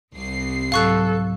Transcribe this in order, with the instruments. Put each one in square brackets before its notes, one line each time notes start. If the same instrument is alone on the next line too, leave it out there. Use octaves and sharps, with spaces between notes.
[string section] C2 C7
[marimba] G#2 F#3 [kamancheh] A4 [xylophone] F5 C#6 F#6